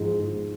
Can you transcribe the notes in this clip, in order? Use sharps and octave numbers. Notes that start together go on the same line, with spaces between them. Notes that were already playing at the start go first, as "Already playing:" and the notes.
Already playing: G#2 F3
G#2